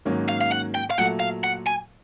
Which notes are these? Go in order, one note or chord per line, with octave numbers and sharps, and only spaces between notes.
G#2 D#3 F#3 A#3 C#4
F5
F5
F#5
G5
F5
A#2 F#3 A3 F#5
F5
F#5
G#5